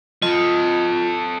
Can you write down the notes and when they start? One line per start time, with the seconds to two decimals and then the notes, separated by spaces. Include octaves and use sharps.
0.22 F4 A4 D#5